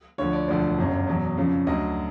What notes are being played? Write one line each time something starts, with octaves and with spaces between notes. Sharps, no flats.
D2 D3 F3 C#5
D5
E1 D2 D3 F3 D5
G1 F#2 C#3
E2 B2 F#3
F2 C#3 F3
D2 D3 F#3 D#5